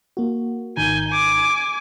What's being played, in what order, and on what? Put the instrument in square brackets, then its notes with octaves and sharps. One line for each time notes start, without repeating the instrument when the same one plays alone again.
[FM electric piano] A#3 F#4
[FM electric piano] G#1 D#3 A#5 [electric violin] G#5 G6
[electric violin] G#5 D6